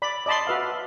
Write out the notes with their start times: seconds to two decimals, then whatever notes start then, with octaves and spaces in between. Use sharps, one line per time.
0.02 D5 B5
0.26 D5 D#5 A5 B5 C6
0.47 F#4 B4 E5 F5